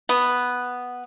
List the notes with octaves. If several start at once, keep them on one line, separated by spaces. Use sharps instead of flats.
B3